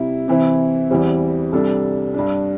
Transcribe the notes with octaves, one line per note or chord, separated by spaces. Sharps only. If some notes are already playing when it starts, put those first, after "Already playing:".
Already playing: C3 G3 E4
C3 E3 C4 E4
E2 E3 G3 C4
C2 C3 G3 D4 A4
G2 G3 D4